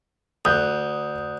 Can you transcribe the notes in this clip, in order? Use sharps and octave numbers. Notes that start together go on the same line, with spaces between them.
D2 D#6 F#6 G6